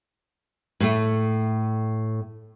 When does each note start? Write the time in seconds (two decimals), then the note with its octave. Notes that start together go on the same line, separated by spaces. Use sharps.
0.80 A2 A3